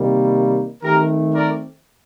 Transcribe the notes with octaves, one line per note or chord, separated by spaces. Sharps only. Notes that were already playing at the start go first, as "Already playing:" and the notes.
Already playing: C3 D#3 G3 A#3
D#3 A3 C4 G4 A#4
A#4 D5